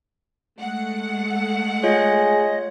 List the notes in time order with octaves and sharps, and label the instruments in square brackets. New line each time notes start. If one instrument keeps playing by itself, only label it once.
[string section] G#3 A3 F#5
[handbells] F4 C#5 [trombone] G#4 [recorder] D#5